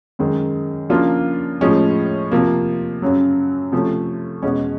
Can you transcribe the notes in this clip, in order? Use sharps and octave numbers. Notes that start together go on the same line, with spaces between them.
F#2 D#3 G#3
C#3 F3 A#3 D4 F4
A2 F3 G#3 C#4
C3 F3 A#3
F#2 C#3 F#3
C3 F3 A3 C#4
E2 B2 G#3 C#4